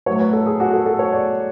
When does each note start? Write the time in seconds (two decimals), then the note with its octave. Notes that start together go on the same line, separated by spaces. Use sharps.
0.06 A2 F#3 A3 C#5
0.19 B4
0.33 A4
0.46 G#4
0.60 F#4
0.73 A4
0.86 A4
0.99 C#5
1.13 D5